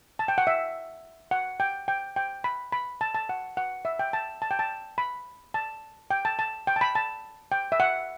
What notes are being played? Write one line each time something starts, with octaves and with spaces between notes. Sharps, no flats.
A5
G5
F#5
E5
F#5
G5
G5
G5
B5
B5
A5
A5
F#5
F#5
E5
G5
A5
A5
G5
A5
B5
A5
G5
A5
A5
G5
A5
B5
A5
G5
E5
F#5